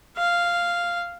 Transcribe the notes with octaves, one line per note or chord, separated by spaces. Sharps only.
F5